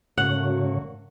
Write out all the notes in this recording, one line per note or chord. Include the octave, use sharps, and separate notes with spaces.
G#2 C#3 A3 A#3 F#4 C#5 F#5